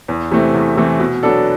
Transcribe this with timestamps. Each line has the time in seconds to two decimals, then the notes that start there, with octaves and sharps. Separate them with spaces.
0.08 E2
0.31 C3 E3 A3 C4
0.54 E2
0.76 C3 E3 A3 C4
1.00 B2
1.23 F#3 B3 D4 A4